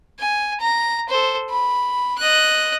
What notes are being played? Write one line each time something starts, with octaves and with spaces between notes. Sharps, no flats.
G#5
A#5
A4 C5
B5
D#5 F#6